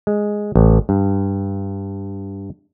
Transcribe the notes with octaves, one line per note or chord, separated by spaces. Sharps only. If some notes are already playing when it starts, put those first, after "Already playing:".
G#3
A1
G2